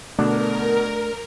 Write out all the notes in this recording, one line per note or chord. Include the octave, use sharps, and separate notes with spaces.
B2 D3 A3 B3 D4 A#4